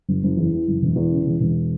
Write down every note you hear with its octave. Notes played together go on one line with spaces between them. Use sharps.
F#1
F#1
E2
E3
F#1
E1
E2
C#3
E1
E1